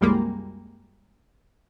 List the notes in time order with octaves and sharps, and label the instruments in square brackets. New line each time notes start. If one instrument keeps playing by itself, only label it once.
[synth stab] C2 F#2 G3 G#3 A#3